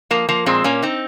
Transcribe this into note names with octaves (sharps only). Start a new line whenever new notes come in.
F3 A#3
F3 A#3
A#2 G#3 C4
A#2 A#3 C#4
C4 D#4